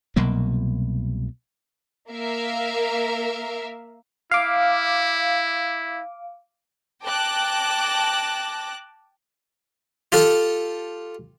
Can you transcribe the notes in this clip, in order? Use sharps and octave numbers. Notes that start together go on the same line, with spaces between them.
C2 B2 F#3 A#3
A#3 A#4 E5 F5
E4 F5 D6
G5 A5 D6 F#6 A#6
F4 G4 A4 F5